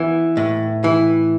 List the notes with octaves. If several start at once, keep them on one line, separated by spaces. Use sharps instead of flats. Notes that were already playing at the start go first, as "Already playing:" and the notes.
Already playing: E3 B3
A2
E3